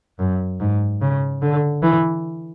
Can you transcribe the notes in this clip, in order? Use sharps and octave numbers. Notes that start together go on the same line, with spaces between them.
F#2
G#2
C#3
D3
E3